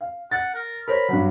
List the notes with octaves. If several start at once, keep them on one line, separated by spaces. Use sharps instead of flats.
F5
F#5 A6
A#4
A#4 C5 C#5 B5
G2 F#3